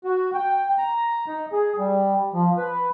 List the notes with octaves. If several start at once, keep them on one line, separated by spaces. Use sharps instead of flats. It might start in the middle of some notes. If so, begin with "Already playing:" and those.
F#4
G5
A#5
D#4
G#4
G3
F3
B4